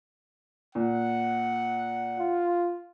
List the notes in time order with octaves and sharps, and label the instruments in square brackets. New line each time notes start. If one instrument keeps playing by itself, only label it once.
[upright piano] A#2 [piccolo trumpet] F#5
[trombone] F4